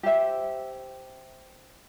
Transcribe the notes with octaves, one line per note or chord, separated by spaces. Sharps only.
G4 C5 E5